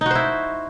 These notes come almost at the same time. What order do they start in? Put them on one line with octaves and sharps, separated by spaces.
D#4 F#4 C5 E4